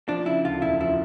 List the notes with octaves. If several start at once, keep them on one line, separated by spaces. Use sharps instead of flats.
F3 D4
C#3 E4
D2 F4
E1 E4
F3 E4